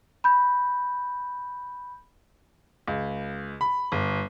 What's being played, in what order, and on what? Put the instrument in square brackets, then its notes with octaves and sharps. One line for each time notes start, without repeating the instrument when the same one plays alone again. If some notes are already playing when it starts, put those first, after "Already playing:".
[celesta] B5 G6
[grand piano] C#2
B5
G1